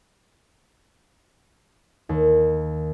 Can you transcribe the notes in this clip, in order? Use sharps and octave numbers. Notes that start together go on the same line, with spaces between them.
D#2